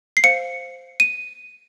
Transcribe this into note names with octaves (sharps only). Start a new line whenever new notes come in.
C7
C5 F5 C#7
D#7